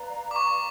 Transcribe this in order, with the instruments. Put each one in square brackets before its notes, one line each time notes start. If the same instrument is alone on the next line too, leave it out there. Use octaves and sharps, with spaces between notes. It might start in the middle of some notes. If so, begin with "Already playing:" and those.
Already playing: [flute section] B4 D5 F5 A#5
[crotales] D6
C#6